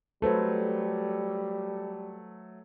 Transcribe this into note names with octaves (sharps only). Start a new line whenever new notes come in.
F#3 G3 A3 A4 B4 C5